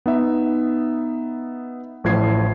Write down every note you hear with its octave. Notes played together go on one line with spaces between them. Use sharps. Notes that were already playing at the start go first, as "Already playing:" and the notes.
B3 D#4 E5
A1 A2 F3 G#6 C7